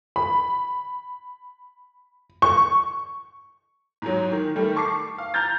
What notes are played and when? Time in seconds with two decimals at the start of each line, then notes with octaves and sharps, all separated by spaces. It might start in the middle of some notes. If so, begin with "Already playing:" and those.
0.16 B5
2.42 C#6
4.02 G#2 F#3
4.32 D#3
4.56 D#3 G3 A3
4.76 A5 C#6 D6 C7
5.18 F5
5.34 A#5 F6 G6 A6